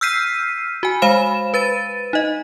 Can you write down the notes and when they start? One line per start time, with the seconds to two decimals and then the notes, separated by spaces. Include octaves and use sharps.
0.01 E6 F6 G6 B6 C7 D#7
0.83 F#4 G#5
1.02 G#3 C5 F5 B5 E7
1.54 B4 A6 D#7
2.13 D#4 D#5